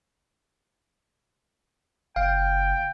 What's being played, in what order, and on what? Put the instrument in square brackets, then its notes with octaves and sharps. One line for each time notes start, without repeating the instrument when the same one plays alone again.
[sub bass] F#1 [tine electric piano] F5 [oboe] G5